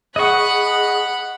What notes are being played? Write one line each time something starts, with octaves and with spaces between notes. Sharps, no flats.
G#4 D#5 F#5 B5 C#6 D#6